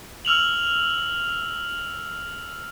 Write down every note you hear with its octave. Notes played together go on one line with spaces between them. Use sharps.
E6 F6 F7 F#7